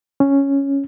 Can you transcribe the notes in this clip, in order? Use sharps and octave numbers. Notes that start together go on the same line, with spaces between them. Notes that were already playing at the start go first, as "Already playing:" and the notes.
C#4